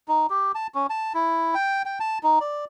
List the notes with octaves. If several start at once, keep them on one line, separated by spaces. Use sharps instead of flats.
D#4
G4
A5
C#4
A5
E4
G5
G5
A5
D#4
D5